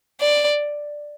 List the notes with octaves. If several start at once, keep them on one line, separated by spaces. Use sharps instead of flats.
D5